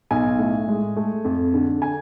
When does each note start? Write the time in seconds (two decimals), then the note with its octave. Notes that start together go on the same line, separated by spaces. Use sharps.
0.11 B1 G#5
0.39 A2
0.68 G#3
0.96 A3
1.25 F2
1.54 D3
1.82 G#5